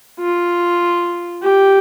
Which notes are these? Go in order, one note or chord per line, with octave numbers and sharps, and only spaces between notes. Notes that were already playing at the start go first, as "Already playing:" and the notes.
F4
G4